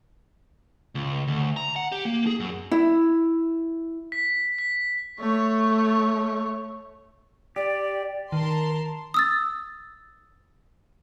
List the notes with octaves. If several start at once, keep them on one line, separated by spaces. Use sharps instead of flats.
C#2
D2
A#5
F#5
G4
A#3
G#4
F#2
E4
B6
B6
A3 C#5
G4 D5
D#3 A#4 A5 C6
D#6 E6 A6